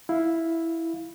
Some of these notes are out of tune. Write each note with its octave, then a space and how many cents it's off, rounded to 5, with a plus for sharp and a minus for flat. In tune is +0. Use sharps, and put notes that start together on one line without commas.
E4 +0 F5 +0